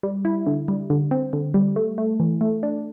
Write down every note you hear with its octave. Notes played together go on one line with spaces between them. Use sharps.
G3
E4
D3
G3
D3
C4
D3
G3
A3
A3
E3
A3
D4